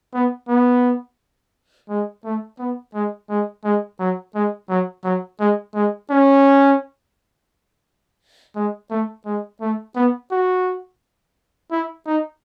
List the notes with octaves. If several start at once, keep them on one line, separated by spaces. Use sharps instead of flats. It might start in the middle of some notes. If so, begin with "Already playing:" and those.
B3
B3
G#3
A3
B3
G#3
G#3
G#3
F#3
G#3
F#3
F#3
G#3
G#3
C#4
G#3
A3
G#3
A3
B3
F#4
E4
D#4